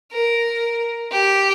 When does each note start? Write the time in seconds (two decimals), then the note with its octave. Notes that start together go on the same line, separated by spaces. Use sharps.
0.12 A#4
1.12 G4